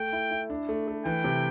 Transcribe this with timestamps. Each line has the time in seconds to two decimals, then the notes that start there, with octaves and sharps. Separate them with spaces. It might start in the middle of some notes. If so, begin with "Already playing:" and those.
Already playing: A3 G5
0.13 E4
0.31 E4
0.50 D4
0.69 A3
0.88 A3
1.05 E3 G5
1.24 C3